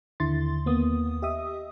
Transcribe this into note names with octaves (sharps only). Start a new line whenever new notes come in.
D#2 D3 E4 C6 A6
D#2 A#3 B3 D#6
G4 D#5 E5 D#6